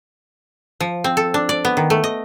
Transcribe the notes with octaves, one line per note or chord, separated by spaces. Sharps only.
F3
C4
A4
D4
D5
B3
D#3
A3
D#5